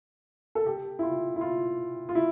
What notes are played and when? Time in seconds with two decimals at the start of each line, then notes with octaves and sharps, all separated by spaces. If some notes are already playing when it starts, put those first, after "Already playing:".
0.55 A4
0.66 G4
0.99 E4
1.03 F4
1.36 E4
1.41 F4
2.09 F4
2.15 E4